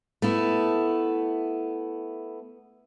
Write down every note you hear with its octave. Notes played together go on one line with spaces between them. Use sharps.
A3 B3 E4